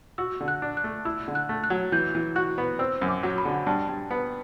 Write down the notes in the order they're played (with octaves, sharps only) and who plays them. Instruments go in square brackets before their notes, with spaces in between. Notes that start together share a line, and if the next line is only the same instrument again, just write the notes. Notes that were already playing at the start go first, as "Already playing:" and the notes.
[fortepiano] F#4 [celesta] E6
[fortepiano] D3
[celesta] F#6
[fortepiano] D4
[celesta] F#6
[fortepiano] A3
[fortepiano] E4 [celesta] E6
[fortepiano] D3
[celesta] F#6
[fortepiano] A3
[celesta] F#6
[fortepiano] F#3
[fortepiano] E3 [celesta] G6
[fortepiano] E3
[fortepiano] F#4 [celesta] F#6
[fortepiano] B3
[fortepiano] C4 [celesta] E6
[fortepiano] F#2
[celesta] D6
[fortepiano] F#3
[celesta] B5
[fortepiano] D3
[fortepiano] G2 [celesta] A5
[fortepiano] G2
B3